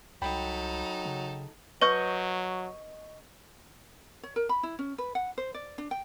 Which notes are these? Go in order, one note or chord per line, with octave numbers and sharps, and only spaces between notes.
C2 F#3 D#4 A4 G5 B5
C#3
F#3 B4 D#5 C#6 G6
C#5
A#4
B5
E4
C#4
B4
F#5
C5
D5
D4
G5